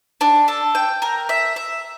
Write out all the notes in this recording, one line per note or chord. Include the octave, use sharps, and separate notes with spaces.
D4
A4
G5
A#4
E5
E5